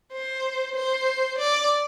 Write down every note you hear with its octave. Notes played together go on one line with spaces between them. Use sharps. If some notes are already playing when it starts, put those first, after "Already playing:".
C5
C5
D5